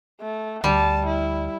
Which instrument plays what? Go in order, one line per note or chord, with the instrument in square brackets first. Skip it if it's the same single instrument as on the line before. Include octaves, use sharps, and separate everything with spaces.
[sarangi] A3
[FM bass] D2 [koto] G3 [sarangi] A5
[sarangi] E4